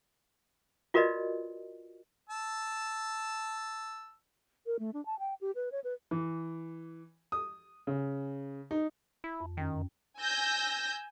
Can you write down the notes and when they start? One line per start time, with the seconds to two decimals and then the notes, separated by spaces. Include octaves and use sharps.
0.94 F4 F#4 A#4 B4 D5 D#5
2.29 A5 E6
4.66 A#4
4.79 A3
4.94 D4
5.06 A5
5.19 G5
5.41 G4
5.55 B4
5.72 C#5
5.84 B4
6.11 E3
7.32 D#6
7.87 C#3
8.71 D#4
9.24 E4
9.40 F2
9.57 F#2 D#3 C#4 G5
10.19 G#5 E6 G6 A#6